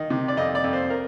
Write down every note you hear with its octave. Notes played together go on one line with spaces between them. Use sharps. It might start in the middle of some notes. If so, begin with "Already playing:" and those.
Already playing: D#3 D#5
C3
D5
F2 D#5
D5
F2
C5
A#4